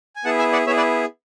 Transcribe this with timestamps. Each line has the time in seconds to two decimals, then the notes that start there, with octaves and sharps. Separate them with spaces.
0.16 G#5
0.25 B3 E4 G#4 F#5 A5
0.39 E5 G#5
0.52 D5 F#5
0.67 B3 E4 G#4 C#5 E5
0.77 B4 D5